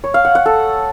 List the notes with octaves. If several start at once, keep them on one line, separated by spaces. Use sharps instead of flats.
C#5
F5
F#5
F#5
A4